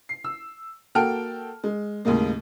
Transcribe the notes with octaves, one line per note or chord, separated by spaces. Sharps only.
C7
E6
A#3 F#4 A4 G5 F6 D7
G#3
D#2 A2 C#3 G#3 A#3